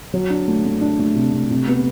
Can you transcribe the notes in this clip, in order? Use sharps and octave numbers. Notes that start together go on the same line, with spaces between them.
F#3
D4
A3
A3
D4
A3
C3
A3
C3
B3